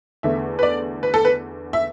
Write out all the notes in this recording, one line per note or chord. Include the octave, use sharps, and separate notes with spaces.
E2 D3 A3 E5
B4
D5
B4
A4
B4
E5